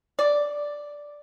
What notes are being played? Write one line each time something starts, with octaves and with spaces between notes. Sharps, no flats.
D5